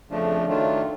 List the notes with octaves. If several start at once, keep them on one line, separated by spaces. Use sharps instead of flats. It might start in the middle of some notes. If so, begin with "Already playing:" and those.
F2 C#3 F3 A3 D4
D#3 F#3 A3 D4 F4